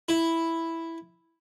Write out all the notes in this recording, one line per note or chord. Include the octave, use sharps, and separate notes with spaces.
E4